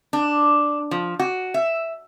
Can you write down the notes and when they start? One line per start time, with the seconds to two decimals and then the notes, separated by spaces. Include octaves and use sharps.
0.13 D4
0.91 F3
1.19 F#4
1.54 E5